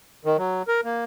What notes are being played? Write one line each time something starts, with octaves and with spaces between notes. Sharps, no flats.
D#3
F#3
A#4
A#3